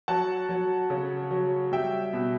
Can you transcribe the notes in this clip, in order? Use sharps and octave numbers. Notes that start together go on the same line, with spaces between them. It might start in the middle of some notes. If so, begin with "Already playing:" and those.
F#3 F#5 A5
F#3
C#3
F#3
G3 E5 G5
B2